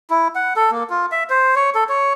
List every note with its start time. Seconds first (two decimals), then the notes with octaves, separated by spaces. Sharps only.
0.10 E4
0.35 F#5
0.56 A4
0.71 A#3
0.90 F4
1.12 E5
1.30 C5
1.56 C#5
1.75 A4
1.89 C#5